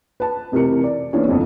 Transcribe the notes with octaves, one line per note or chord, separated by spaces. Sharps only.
B4 A5
F1 C3 E3 A#4 C#7
D5
E3 A#3 B3 C#4 D4
G1 F2